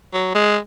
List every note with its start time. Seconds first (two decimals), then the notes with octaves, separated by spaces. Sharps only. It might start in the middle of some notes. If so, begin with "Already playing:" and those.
0.13 F#3
0.35 G#3